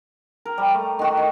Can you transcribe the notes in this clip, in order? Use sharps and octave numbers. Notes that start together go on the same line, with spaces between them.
A#4
G3
A3
D#3 F#4
D#3